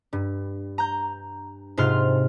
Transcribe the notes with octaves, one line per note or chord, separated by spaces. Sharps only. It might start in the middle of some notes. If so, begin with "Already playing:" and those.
G2
A#5 G6
G#2 C3 F4 C6 F6